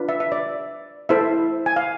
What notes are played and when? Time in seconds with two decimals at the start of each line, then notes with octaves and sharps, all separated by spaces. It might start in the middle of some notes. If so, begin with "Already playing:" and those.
Already playing: D4 F4 B4
0.09 E5
0.20 E5
0.32 D5
1.09 E4 A4 C5 E5
1.66 G#5
1.76 F5